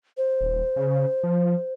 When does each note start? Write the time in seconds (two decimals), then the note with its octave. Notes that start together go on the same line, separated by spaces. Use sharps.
0.17 C5
0.41 D#1
0.76 C#3
1.23 F3